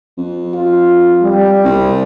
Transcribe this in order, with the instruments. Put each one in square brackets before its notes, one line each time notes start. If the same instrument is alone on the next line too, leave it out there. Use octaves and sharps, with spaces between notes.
[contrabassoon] F2
[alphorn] F4
G3
[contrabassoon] C2